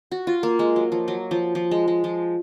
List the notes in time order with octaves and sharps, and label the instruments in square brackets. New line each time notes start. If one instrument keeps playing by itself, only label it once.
[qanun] F#4
F4
A#3
G#3
F#3
F3
F#3
F3
F3
G#3
G#3
F3